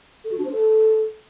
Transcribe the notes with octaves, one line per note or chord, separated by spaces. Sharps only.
A4
F#4
D4
C5
A4